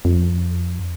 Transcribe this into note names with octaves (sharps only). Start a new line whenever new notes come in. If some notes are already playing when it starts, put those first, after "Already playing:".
F2